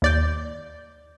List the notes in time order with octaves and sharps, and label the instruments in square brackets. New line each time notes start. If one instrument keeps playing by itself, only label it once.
[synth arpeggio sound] D#2 D5 G6